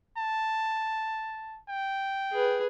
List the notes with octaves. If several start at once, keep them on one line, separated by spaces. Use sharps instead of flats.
A5
G5
G#4 B4